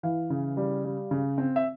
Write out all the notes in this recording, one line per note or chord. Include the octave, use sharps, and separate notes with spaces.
E3 F5
C#3
G3
G3
C#3
C4
E5